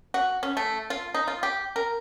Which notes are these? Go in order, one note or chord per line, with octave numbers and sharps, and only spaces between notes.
F#4
C#4
A3
F4
D#4
F4
G4
A#4